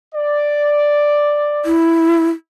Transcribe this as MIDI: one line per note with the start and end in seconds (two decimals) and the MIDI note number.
0.15 1.75 74
1.65 2.28 64